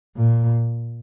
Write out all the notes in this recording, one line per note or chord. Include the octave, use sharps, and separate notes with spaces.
A#2